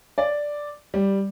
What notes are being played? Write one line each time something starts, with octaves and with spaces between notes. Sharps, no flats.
D5
G3